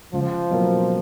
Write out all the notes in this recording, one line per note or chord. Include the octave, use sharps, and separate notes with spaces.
C#2 F3
B2 F#3 A#3